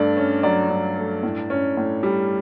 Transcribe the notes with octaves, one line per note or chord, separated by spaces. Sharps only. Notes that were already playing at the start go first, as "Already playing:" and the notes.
Already playing: G2 A3 D5
C#4
F#3 D5
G2
A3
A2
C#4
A2
G3